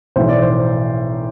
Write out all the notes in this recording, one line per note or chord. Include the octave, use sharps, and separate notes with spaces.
B1 A2 E3 C5
D5
C5